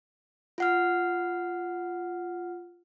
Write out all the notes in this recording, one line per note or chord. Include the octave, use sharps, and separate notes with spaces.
F4 F#5 F6